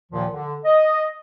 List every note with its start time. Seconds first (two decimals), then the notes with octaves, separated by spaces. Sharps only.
0.12 D#2 A#2 D#3 F3
0.32 D3
0.65 D#5